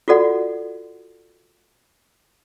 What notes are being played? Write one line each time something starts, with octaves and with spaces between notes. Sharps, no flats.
F4 F#4 A4 D5 F#5